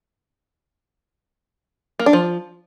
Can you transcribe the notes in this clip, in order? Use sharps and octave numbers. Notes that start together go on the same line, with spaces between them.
A#3
D4
F3